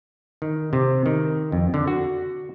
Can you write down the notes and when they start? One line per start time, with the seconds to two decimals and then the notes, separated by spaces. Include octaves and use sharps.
0.42 D#3
0.73 C3
1.06 D#3
1.52 F2
1.74 D3
1.88 F#4